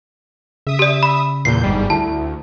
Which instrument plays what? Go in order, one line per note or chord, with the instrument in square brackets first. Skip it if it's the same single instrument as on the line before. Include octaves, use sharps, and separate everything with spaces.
[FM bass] C#3 [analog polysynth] E5 D#6
[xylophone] G4 D5
B5
[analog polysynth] E2 A#2 G6 [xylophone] C7
[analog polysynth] G1 G#2 G3
[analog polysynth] D2 [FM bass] E4 [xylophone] A5